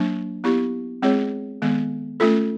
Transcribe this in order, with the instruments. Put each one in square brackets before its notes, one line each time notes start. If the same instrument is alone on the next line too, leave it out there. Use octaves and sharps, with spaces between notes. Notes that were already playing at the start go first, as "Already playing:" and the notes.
Already playing: [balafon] F#3 A#3 D4
B3 E4 G4
G#3 C4 F4 G#4 C#5
D#3 G#3 B3
A3 C#4 F4 A4